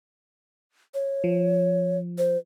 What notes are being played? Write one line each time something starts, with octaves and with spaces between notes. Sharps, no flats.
C#5
F3
C5